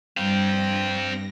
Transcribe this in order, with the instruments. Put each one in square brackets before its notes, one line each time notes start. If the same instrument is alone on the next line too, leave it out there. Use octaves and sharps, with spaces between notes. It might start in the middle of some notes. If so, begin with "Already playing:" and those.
[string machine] G2 A#6 [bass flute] G3 [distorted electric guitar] C4 F5 [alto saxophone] G5